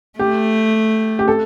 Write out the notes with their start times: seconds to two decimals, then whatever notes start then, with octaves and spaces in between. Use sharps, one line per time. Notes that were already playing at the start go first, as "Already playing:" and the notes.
0.19 A3 G4
1.19 G4
1.28 A4